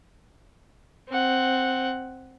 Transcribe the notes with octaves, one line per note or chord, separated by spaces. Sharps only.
C4 F#5